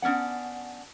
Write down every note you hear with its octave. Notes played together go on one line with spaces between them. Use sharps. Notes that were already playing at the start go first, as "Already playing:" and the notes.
B3 C#4 D4 F#5